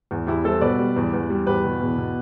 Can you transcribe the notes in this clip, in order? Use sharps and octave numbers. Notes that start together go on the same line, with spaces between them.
E2
E2 E4 G4
G3 A4 C5
B2 B4 D5
G3
E2
E2
G3
E2 G4 B4
B2
E2
B2